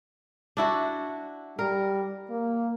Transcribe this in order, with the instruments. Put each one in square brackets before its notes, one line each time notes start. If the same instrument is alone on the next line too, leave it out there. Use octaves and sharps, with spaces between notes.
[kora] D4 E4 F#4
[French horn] G3 [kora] A#4
[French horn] A#3